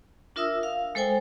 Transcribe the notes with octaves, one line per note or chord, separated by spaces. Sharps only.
D4 F4 A#4 E5 D#6 E6
F5
G#3 A4 C5 G5 G#5